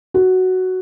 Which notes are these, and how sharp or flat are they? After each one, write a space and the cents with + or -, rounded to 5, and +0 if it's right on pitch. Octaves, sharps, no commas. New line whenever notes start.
F#4 +5